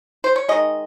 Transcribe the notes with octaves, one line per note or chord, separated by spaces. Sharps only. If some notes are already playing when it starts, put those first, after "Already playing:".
C5
C#5
D#3 G#3 D#5